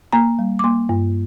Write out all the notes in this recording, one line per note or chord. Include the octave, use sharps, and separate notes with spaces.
A#3 A#5
G3
D6
A#3 C6
G2